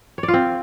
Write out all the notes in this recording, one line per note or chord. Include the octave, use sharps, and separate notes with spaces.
C#5
D5
F4
C4